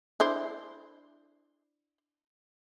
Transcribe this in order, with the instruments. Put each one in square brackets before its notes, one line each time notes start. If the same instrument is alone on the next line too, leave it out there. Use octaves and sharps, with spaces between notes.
[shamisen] D4 E4 C5